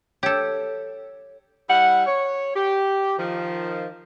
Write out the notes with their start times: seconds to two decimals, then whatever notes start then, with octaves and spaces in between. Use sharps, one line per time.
0.23 G4 A4 C#5
1.70 G3 E4 F#5
2.07 C#5
2.56 G4
3.19 D#3 F3